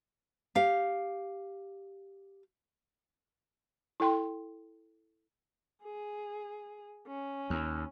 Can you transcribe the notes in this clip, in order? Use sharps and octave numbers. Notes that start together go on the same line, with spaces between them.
G4 F5
E4 A4 G5 C6
G#4
C#4
D#2